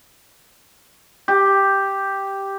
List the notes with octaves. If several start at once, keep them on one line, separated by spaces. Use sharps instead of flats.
G4